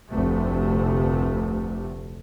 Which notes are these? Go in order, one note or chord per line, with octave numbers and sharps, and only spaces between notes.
F1 D2 C3 A3